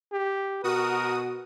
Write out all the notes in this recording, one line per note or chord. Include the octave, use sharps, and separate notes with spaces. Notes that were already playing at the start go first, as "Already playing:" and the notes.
G4
B2 F#4 A#4 D#6